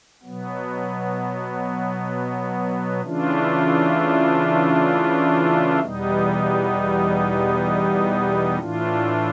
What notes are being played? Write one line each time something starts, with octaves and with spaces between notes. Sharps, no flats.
B2 F#3 B3
C#3 E3 A3 D4 F4
E2 B2 G3 B3 D#4
A2 E3 A3 D4 F4